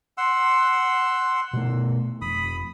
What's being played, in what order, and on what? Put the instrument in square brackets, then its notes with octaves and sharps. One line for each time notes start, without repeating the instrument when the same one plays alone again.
[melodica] F#5 C6 E6
[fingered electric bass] B2 A3
[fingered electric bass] F1 [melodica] B5 D#6